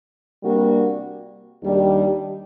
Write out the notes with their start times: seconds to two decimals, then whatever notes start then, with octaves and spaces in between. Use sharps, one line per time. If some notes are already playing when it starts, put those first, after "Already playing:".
0.42 C3 G3 A#3 D4 F#4
1.61 D#2 D#3 G3 D4 G4